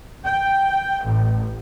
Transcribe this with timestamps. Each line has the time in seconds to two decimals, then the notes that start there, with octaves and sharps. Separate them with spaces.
0.25 G5
1.04 A1